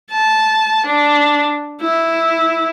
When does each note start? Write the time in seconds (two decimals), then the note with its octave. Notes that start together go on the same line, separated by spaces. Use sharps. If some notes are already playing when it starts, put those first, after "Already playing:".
0.11 A5
0.86 D4
1.82 E4